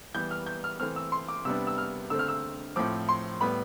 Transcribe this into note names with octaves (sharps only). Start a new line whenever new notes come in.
E3 G3 B3 G6
F6
G6
F6
E3 A3 C4 F6
E6
C6
D6
C3 G3 B3 D4 E6
E6
F6
D3 A3 C4 E6
F6
E6
A2 F3 C4 D6
C6
A2 G3 B3 B5